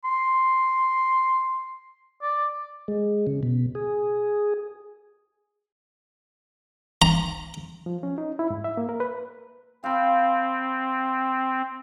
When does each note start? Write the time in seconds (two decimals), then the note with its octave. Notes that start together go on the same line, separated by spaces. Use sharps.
0.05 C6
2.22 D5
2.88 G#3
3.27 C#3
3.43 B2
3.75 G#4
7.02 A#5
7.86 F3
8.03 C#4
8.18 D#4
8.39 E4
8.50 G#2
8.64 E5
8.77 A#3
8.89 A#4
9.00 B4
9.84 C4 F5 B5